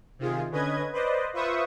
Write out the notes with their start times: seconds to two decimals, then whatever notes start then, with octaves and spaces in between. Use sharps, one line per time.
0.19 C3 D#3 F4 G#4
0.51 D3 C#4 B4 D#5 G#6
0.93 B4 C5 D5 D#5
1.33 F4 B4 C5 E5 C#6 D#6